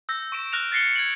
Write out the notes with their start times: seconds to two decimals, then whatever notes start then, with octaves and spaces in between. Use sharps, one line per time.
0.09 E6 G6 A#6
0.32 C#6 D7 E7
0.52 F6 F#6 A#6 D7 F7
0.71 F#6 A6 A#6 C7 C#7 G7
0.96 G#6 D7 F#7